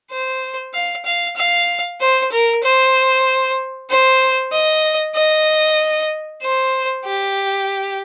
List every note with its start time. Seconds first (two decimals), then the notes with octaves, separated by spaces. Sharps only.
0.11 C5
0.73 F5
1.05 F5
1.36 F5
2.00 C5
2.32 A#4
2.63 C5
3.90 C5
4.52 D#5
5.15 D#5
6.42 C5
7.05 G4